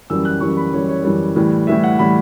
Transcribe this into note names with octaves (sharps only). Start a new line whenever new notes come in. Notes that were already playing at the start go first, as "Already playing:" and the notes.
F#2 E3 G3 E6
F#6
F#2 E3 G3 C#6
B5
F#2 E3 G3 C#5
C#5
F#2 E3 G3
A2 E3 G3
A2 E3 G3 E5
F#5
A2 E3 G3 B5